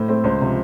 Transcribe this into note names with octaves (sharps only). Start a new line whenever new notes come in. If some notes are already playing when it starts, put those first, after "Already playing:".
Already playing: A2 C5
A3 C4
C#2 C5
C3 F3